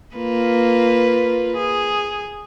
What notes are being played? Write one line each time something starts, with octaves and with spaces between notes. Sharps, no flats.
A#3 F4 B4
G#4